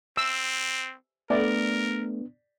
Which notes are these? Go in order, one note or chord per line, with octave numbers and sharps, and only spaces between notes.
C4 E6
A3 B3 D4 A#4 D5